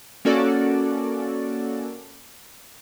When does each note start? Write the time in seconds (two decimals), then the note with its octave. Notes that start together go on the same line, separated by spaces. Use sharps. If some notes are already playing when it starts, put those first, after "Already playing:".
0.25 A#3 C#4 F#4 A4 D5